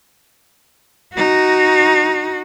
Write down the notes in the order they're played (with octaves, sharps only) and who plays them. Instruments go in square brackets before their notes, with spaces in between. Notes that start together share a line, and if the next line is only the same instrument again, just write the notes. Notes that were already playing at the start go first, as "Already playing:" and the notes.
[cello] D#4 F#4